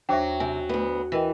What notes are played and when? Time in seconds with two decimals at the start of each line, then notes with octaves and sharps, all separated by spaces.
0.09 D#2 F#3 D4 C5 E5 G5
0.40 C3 G#5
0.69 D2 B3
1.12 E3 A#4 D#5 G5